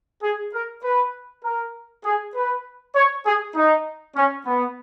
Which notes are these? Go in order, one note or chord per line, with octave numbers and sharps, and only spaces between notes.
G#4
A#4
B4
A#4
G#4
B4
C#5
G#4
D#4
C#4
B3